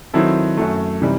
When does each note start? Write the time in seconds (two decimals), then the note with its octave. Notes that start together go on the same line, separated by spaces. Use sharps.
0.14 D#3 F#3 C4 E4 A4
0.57 F#2 F#3 A3
1.02 C3 E3 G3 D#4